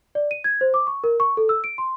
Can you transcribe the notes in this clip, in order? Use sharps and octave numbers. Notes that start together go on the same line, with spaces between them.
D5
D#7
G#6
C5
D6
C#6
A#4
C#6
A4
E6
D7
C6